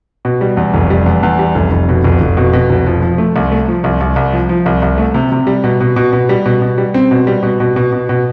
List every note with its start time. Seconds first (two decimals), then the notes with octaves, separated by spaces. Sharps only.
0.25 B2
0.41 G3
0.57 E2
0.74 F1
0.90 G3
1.06 E2
1.23 E2
1.39 G3
1.55 F1
1.71 F1
1.89 B2
2.04 F1
2.21 F1
2.37 B2
2.53 B2
2.70 F1
2.86 F3
3.02 F3
3.18 A3
3.36 C2
3.52 A3
3.68 F3
3.84 C2
4.01 C2
4.16 C2
4.33 F3
4.49 F3
4.66 C2
4.82 C2
4.98 A3
5.14 C3
5.32 C3
5.47 G3
5.64 B2
5.81 B2
5.96 B2
6.13 B2
6.29 G3
6.46 B2
6.62 B2
6.78 G3
6.94 C4
7.11 B2
7.27 G3
7.43 B2
7.60 B2
7.76 B2
7.93 B2
8.09 B2